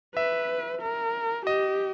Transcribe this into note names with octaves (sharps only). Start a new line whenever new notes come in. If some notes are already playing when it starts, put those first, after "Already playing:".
B4 E5
A#4
G4 D#5